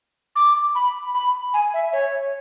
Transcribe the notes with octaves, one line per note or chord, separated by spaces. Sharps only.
D6
B5
B5
G#5
E5
C#5